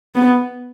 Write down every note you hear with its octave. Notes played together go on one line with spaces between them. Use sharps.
B3